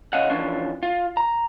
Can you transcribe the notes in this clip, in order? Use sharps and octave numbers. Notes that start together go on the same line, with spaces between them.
C#3 C#4 D#5 F5 F#5
E3 F3 C#4 D4 F4
F4
A#5